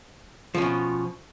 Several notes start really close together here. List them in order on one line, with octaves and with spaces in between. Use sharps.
F3 C#4 B2